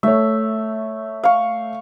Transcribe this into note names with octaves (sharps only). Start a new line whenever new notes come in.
A3 C#5 E5
F5 C#6